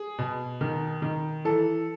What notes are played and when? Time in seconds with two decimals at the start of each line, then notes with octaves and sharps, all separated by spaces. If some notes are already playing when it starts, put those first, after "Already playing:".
Already playing: G#4
0.19 B2
0.61 D#3
1.02 D#3
1.45 E3 A4